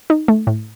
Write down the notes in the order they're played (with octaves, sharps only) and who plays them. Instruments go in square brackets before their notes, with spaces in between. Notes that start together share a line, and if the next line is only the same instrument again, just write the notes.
[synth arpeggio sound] D#4
A3
A2